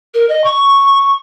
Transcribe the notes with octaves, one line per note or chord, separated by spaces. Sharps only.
A#4
D#5
C#6